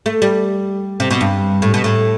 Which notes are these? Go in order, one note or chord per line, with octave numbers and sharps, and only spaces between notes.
A3
G3
C3
B2
G2
A2
B2
A2